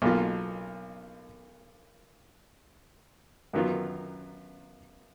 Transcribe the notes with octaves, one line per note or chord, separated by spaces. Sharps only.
B1 B2 A#3 F4
F#2 D#3 F#3 B3 F4